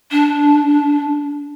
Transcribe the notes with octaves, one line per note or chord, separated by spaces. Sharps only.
D4